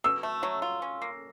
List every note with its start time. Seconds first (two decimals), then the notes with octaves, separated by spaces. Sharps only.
0.04 B2 E6
0.23 A3
0.43 F#3
0.62 F4
0.82 C#4
1.02 A#3